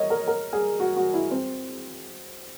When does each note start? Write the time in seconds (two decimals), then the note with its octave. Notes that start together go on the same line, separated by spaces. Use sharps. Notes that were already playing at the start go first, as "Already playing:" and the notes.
Already playing: A#4 C#5 D#5
0.10 A#4
0.28 A#4
0.53 G#4
0.80 F#4
0.96 F#4
1.14 E4
1.31 C4